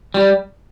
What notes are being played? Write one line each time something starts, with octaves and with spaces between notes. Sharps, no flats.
G3